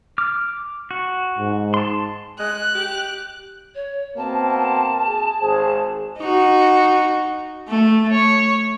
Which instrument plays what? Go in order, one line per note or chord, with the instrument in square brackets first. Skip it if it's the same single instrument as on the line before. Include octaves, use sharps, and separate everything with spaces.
[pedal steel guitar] D6 F6
F#4
[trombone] G#2
[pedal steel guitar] A5 C6
[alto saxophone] G#3 [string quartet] F#6
[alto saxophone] G4
[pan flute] C#5
[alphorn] B2 [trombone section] A#3 C4 [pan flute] A5
[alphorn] G#4
[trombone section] G#1 G#4 [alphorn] C5
[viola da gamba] D#4 F#4
A3
C#5